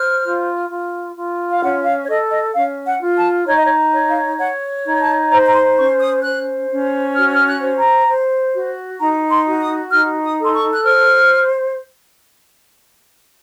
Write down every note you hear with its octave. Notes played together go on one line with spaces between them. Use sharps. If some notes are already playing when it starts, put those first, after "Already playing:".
Already playing: C5 F6
F4
F4
F4
F5
C#4 F#5
F5
C#5
A4 D#5
D#5
C#4 F5
F#5
F4
A5
D#4 C#5
D#5
C#5
C#5
F5
C#5 F#5
D#4
A5
C5 A#5
A#5
C6
C#4 C#6
D#6
C5 F#6
C#4
F#4 F6
F6
F#6
C5
A#5
C5
F#4
D#4 A#5
C6
F#4
D#6
D#4 F6
D#6
A4
C6
C#6
F#6
C5 F6